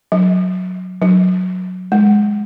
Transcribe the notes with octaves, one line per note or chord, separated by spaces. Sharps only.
F#3
F#3
G#3